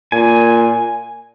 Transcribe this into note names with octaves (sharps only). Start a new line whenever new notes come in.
A#2 G#5